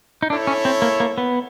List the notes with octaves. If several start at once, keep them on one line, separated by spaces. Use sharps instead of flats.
D#4
D4 E4 A4 C#5
C#4
C4
A#3
A#3
B3